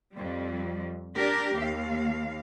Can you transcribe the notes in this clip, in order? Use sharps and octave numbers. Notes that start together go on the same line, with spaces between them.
F2 G3
D4 G4 A#4
D#2 F5